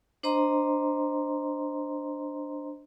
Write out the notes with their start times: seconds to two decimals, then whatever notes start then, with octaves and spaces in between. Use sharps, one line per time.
0.23 D4 C5 D#5 A#5 C6